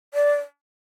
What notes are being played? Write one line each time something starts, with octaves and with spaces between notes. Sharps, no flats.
D5